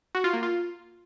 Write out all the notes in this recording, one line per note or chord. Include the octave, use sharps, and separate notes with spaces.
F#4
F4
A#3
F4